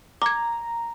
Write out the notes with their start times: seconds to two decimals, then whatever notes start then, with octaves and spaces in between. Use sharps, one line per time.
0.22 A#5 D6 G#6